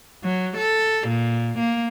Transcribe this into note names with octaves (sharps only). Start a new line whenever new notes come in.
F#3
A4
A#2
A#3